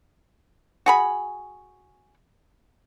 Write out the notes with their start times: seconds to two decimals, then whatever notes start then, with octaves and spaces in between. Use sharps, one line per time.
0.86 F#4 G#4 B5